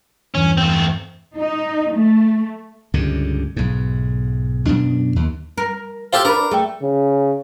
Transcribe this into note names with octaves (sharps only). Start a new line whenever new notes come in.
E2 G2 E3 C#4
A3 C4
D#4
A3
C#2 G2 D3
B1 G#2
F#2 B2 D4
D#2
A#4
F4 G4 A4 C5
D4 A#4 B4 B5 D6
A3 G#4 G5
C#3